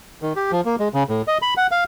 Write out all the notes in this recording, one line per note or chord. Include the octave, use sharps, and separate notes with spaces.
D#3
G4
F3
A#3
G#3
C#3
A2
D#5
B5
F#5
F5